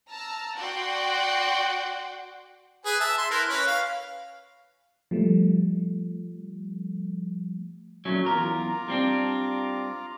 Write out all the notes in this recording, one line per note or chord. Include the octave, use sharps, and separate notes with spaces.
A5 A#5 E6 F6
F#4 D5 F#5 G5 C6 D6
G#4 B4 G#5
E5 A5
E5 C6
E4 A#4 B4
C#4 B4
F5
F3 G3 A3
A#2 F#3 A3 C#4
E2 F4 A#4 A#5 D6
G3 C4 D4